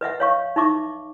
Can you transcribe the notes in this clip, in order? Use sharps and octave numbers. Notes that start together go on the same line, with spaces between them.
B4 D#5 E5 F#5
C#5 F5 C#6
D#4 E5 C#6 D6